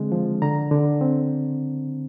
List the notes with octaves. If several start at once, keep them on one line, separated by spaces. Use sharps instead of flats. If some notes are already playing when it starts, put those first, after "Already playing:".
Already playing: D3 G#3 C4
F3
D3 A#5
D3
C4